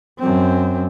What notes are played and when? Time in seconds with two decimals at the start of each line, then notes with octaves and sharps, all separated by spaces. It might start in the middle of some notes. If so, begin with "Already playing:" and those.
0.20 F#2 C4